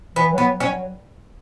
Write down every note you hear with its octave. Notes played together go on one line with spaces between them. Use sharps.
E3 B3
F#3 B3
C#4
F#3